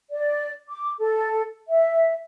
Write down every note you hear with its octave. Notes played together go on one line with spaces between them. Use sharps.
D5
D6
A4
E5